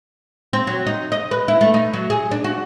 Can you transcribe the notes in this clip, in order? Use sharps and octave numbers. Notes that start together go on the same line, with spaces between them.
C4
F#3
D#4
D#5
B4
E4
A3
D#4
F#3
G#4
D4
F#4